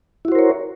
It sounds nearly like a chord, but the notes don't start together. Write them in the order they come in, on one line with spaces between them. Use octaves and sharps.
E4 F#4 C5 A#4 C#5